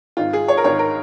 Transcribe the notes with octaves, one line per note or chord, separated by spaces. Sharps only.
G#1 G#2 D#3 F4
G#4
C#5
A#4
G#1 G#2 D#3 C#5
A#4